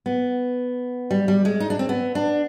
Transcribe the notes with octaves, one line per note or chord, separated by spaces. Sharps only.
B3
G3
G3
G#3
D#4
D4
C4
B3
D4